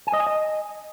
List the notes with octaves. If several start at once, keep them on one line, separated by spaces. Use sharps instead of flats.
G#5
D#5
G#5
D#5